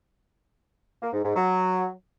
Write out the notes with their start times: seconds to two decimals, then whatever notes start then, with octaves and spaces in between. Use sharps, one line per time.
1.02 A#3
1.13 G#2
1.24 G#2
1.35 F#3